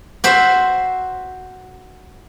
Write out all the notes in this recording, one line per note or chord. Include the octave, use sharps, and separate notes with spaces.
F#4 C5 E5